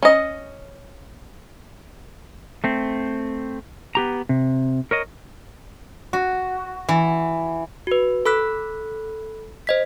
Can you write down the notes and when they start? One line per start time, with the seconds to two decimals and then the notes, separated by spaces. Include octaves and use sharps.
0.03 C#4 D#5
2.64 A3 C4
3.95 B3 G4 A#5
4.29 C3
4.91 A#4 C#5 D#5
6.13 F#4
6.89 E3
7.87 F#4 B4
8.25 A4 B5 E6 F#6 B6
9.67 C5 D#5 B6